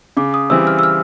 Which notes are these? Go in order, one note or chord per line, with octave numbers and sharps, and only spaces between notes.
C#3 D6
D#6
E3 G3 C4 E6
F6
E6
F6